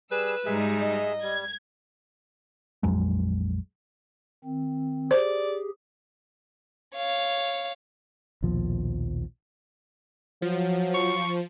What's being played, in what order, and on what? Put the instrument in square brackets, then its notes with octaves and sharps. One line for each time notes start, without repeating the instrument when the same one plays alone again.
[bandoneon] G3 G#4 [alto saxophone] B4 [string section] E6
[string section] G#2 G3 D#4 [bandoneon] G#3 G#4 E5
[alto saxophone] D#5
[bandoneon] G3 [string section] G#6
[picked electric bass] A#1 F2 F#3 G#3
[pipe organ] D#3 C4
[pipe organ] G4 G#4 [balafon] C5 [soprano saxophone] D5
[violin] C#5 F5
[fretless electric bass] A#1 D#2 B2 F3
[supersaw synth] F3 [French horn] F#3
[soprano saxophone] C#6